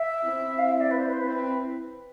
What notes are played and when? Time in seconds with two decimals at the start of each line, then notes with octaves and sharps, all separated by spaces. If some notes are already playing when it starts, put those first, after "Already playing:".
Already playing: E5
0.25 C4 E4
0.58 F5
0.69 E5
0.80 D5
0.91 B4
0.98 C5
1.06 B4
1.13 C5
1.20 B4
1.24 C4 E4 C5
1.35 B4